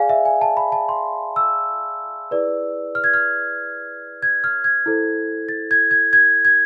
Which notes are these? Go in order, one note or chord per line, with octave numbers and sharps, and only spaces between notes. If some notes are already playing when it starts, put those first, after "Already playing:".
Already playing: G#4 D5 F5 G#5
E5
G#5
A5
B5
A5
C6
E6
E4 G#4 B4 D5
F6
G#6
F6
G#6
F6
G#6
E4 A4 C5
A6
G#6
G#6
G#6
G#6